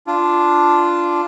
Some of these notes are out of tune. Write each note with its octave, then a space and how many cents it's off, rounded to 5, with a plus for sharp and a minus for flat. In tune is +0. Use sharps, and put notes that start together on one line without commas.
D4 +0 F4 -10